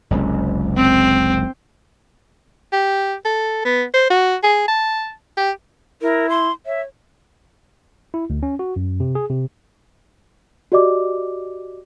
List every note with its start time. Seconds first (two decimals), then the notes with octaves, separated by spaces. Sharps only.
0.11 F#1 C#2 C3
0.76 C4
2.73 G4
3.25 A4
3.65 B3
3.94 C5
4.10 F#4
4.43 G#4
4.68 A5
5.37 G4
6.02 E4 A#4
6.30 C6
6.66 C#5 E5
8.14 E4
8.30 D2
8.43 C#4
8.59 F#4
8.76 F#2
9.00 C3
9.15 G#4
9.30 C3
10.72 F#4 G4 D5 D#5 D6